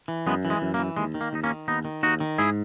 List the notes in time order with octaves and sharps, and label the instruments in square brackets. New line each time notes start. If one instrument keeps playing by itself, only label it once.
[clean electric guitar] E3
F#2 G#3 B3
E3
G#3
F#2
A#3
E3
D#2 G#3
D#3
A#3
D#2 D#4
A#3 C#4
D#3
D#2 B3 D#4
D#3
D#2 D#4 F#4
D#3
G#2 E4 G#4